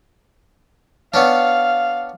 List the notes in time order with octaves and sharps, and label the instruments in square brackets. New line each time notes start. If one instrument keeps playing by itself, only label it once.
[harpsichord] B3 C#4 D4 [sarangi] F5